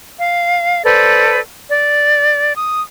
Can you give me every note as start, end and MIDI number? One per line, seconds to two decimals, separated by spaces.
0.19 0.84 77
0.85 1.39 69
0.85 1.39 71
0.85 1.39 72
0.85 1.39 74
1.69 2.56 74
2.56 2.81 87